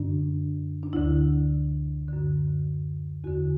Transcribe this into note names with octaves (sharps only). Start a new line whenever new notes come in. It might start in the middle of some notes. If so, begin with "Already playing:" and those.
Already playing: F#2 D3 D4
D4
D2 D3 E4
F#2 D3
E2 D3 F#4